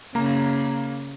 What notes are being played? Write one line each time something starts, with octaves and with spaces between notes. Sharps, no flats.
C#3 A#3 A#5